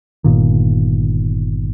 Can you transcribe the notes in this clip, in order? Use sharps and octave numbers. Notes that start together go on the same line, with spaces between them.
G1 C2 A#2 D#3